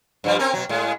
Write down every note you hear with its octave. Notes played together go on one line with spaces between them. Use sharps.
G2 F3 G3
C4 C#4 A#4
B2 F#3
A2 G#3